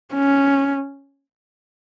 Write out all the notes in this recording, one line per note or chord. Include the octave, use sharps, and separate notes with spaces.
C#4